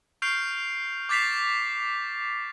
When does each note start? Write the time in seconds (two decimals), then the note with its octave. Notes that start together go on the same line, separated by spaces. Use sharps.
0.22 C#6 F6 G6 C7 D7 F7
1.09 D6 G6 A6 B6 C7 F7